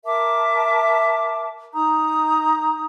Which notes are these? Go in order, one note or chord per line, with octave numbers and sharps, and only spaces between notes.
A#4 E5 A5 D6
D#4 A#5 D#6 G6